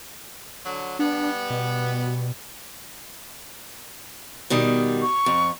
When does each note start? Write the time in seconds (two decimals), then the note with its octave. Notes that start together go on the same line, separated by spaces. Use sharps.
0.65 D3 F#3
0.99 G3 B3 D4
1.50 B2
4.50 B2 D#3 G3
5.02 C#6
5.26 F2